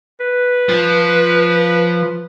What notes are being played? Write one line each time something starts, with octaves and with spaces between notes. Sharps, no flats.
B4
F3